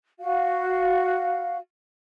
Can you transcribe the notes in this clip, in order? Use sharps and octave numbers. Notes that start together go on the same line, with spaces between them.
F#4 F5